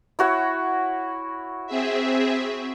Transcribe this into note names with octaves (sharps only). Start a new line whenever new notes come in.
E4 F#4 C#5
C4 G#4 E5